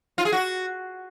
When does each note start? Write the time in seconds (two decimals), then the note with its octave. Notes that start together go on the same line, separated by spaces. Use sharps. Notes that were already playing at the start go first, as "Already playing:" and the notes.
0.18 F4
0.25 G#4
0.32 F#4